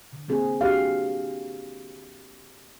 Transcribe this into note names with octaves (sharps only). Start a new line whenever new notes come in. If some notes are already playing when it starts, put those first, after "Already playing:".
D3
A#3 C4 G#4
D4 F#4 G4 F5